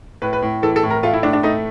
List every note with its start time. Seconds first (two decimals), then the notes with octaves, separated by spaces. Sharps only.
0.22 A2 B4
0.33 B4
0.42 A2
0.62 E3 A4
0.76 A4
0.83 A2
0.90 A#4
1.03 A3 F4
1.13 E4
1.23 A2 D4
1.33 D4
1.43 A3 D#4